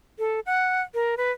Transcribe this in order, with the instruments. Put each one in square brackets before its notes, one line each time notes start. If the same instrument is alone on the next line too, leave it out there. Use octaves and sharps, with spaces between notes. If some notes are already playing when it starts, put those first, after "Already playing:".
[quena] A4
F#5
A#4
B4